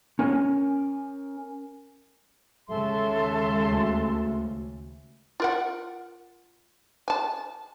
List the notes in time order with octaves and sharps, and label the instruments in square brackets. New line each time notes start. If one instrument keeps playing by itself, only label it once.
[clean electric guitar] C#4 A#4 G#5
[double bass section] D#2 C#3 G#3 [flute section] A4 E5 C6
[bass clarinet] D2
[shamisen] F4 A#4 F#5
G#5 A5